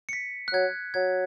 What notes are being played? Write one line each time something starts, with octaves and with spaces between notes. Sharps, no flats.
C#7
B6
F#6
F#3 G#6
F#3 G#6